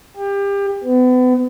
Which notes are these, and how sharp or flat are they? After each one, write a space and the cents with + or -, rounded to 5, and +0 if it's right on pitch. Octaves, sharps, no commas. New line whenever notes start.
G4 +30
B3 +35